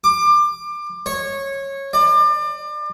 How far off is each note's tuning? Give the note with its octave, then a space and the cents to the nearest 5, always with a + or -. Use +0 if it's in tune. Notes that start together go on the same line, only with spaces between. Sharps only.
D6 +25
C#5 -15
D5 +30